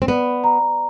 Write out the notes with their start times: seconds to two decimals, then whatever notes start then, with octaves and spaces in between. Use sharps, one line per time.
0.02 C4
0.08 B3 D5
0.44 A#5